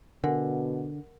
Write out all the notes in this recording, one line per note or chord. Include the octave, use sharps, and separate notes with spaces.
B2 D3 A#4 F#5 G#5